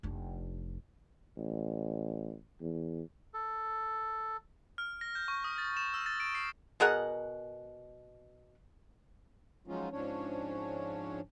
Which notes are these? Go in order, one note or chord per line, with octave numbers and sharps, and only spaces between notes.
F1 D4
A1
E2
A4
F6
A#6
G6
C#6
D#6
A6
E7
E6
A6
D7
C7
B2 G#4 A#4 F#5
F3 F#3 G#3 C#4 D#4 F4
G#2 F3 C#4 D4 C#5